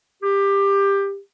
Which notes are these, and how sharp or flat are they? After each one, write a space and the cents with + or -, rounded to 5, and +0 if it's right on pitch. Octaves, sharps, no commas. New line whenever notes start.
G4 +15